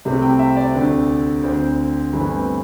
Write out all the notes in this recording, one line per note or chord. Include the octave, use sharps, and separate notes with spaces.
C2 C3 A3 C4
G5
E5
D5
D2 D3 A3 C4
D2 D3 C4 C5
G1 G2 E3 A3 C4